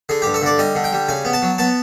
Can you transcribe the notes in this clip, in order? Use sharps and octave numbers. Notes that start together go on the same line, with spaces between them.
D3 G#4
G2 G4
A4
D3 D5
G3 D#5
D3
G5
G3
C#3 G#5
B3
A5
F#3
B3 A5